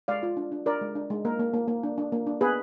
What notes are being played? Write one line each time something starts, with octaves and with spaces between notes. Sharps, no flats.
G#3 D5 F5
F4
D4
D4
D4 A#4 D5
G#3
D4
G#3
A#3 A#4
A#3
A#3
A#3
D4
D4
A#3
D4
B3 G#4 B4